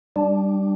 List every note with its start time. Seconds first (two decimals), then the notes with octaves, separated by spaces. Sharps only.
0.16 G3 D4